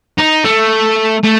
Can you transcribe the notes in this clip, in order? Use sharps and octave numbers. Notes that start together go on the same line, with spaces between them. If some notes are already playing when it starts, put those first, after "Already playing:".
D#4
A3
A3